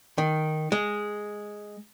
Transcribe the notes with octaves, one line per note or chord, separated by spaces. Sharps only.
D#3
G#3